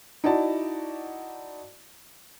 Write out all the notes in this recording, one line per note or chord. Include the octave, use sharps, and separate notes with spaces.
D#4 E4 F#4 D5 A5